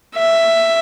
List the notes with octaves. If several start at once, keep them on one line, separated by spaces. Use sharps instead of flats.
E5